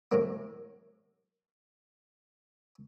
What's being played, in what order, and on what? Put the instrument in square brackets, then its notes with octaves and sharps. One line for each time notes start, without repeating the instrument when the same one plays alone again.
[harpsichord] A2 C3 F#3 A#3